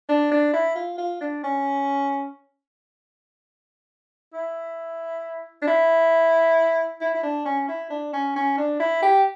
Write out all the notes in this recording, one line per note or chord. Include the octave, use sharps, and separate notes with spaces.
D4
D4
E4
F4
F4
D4
C#4
E4
D4
E4
E4
E4
D4
C#4
E4
D4
C#4
C#4
D4
E4
G4